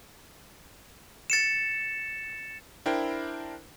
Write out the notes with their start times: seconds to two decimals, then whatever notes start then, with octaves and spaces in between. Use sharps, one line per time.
1.30 A6 C#7 E7
2.86 D4 E4 A#4 C5 G5